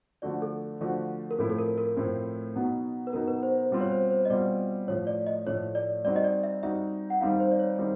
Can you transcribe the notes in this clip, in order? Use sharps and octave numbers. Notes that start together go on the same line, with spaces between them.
D3 F3 A3 D4 F#4 D5
A4
D3 F3 A3 D4 F#4
A#4
A2 F3 A3 C4 E4 A4
A4
A#4
A#4
A2 F3 A3 C4 E4
B2 F#3 B3 D#4
B4
B2 F#3 B3 D#4 A#4
B4
C5
C5
B2 G3 C4 F4
C#5
C5
C5
D#5
B2 G3 C4 F4 D5
A2 F3 A3 C#5
D5
D#5
A2 F3 A3 C#5
D5
G3 C4 D#4 F#4 D5
D#5
D5
E5
G3 C4 D#4 F#4 E5
F#5
D#3 G3 C4 D#4 F5
C5
D5
C#5
D#3 G3 C4 D#4